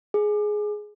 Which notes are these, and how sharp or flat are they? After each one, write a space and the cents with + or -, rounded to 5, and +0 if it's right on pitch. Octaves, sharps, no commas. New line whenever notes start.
G#4 +10